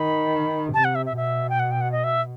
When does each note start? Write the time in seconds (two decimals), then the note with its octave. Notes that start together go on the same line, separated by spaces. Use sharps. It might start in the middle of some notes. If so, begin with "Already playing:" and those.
Already playing: D#3 B5
0.73 C3 A5
0.85 F#5
0.95 E5
1.06 E5
1.17 B2 E5
1.50 G5
1.60 F#5
1.71 G5
1.81 F#5
1.92 D#5
2.04 E5